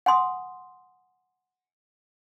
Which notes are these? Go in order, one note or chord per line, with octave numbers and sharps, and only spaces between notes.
F#5 G#5 C6 D#6